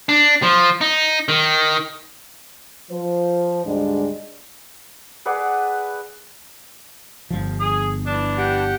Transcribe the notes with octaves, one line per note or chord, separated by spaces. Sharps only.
D4
F3
D#4
D#3
F3 C5
D2 G#2 G3 G#3 D4
G#4 B4 D5 F#5
G1 F3
G#4
E3 D4
G4 F#5 G5